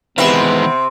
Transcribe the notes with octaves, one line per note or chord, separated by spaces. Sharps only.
C3 D#3 E3 G#3 B3 C4 B4 E5